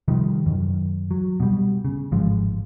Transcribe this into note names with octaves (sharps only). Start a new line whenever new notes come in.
C3 D#3 F3 G3
F#2 D#3
F#3
B2 G3
C#3
G#1 A2 F3 G#3